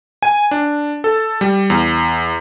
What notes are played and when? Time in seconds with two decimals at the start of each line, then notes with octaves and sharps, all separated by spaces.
0.23 G#5
0.51 D4
1.04 A4
1.41 G3
1.70 E2